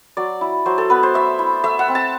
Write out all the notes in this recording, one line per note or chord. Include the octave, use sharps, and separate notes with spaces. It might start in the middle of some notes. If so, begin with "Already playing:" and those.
F#3 D5
E4
F#3 C5
A4
B3 B4
C5
A3 E5
E4
A3 E5
F#5
C4
A5